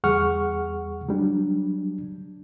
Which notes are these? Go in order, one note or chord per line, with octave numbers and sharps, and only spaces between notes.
E2 G3 G#4 F#5 C#6 F6
F#3 G3 D4